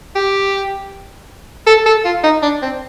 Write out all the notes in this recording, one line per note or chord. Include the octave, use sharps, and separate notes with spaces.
G4
A4
A4
F4
D#4
D4
C4